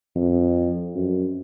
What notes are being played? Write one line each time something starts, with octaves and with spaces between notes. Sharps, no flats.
F2
F#2